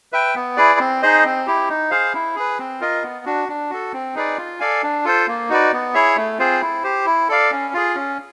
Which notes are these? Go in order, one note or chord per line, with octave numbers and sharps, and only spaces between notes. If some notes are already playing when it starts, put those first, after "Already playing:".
B4 E5 G5
B3
E4 G#4 B4 D5
C4
D#4 G#4 C5 D#5
C4
E4 G4
D#4
G#4 C5 F5
E4
G#4 B4
C4
F4 A#4 D#5
B3
D4 F#4
D4
F#4 A4
C4
D#4 G#4 B4 D5
F4
A4 D5 F5 G#5
D4
F4 A4 C5
A#3
D#4 F#4 B4 D5
B3
E4 G#4 C#5 E5
A3
C4 F4 G#4 C5
E4
G4 C5
E4
A4 D5 F5
C#4
F4 G#4
C#4